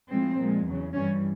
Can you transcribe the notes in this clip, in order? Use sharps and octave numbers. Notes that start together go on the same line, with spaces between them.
A2 F3 G#3 C4
A#2 F3 G#3
E2 C#3 F#3
G2 E3 G3 C#4